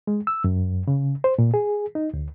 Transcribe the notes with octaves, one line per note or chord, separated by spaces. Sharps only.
G#3
E6
F#2
C#3
C5
A#2
G#4
D#4
D2